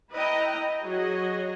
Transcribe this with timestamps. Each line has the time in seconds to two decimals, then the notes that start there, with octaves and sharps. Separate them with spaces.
0.13 E4 B4 D#5 G5 A#5
0.83 F#3 F#4 G#4 C#5 D#5